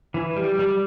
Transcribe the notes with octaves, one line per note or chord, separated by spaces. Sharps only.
E3
G3
G3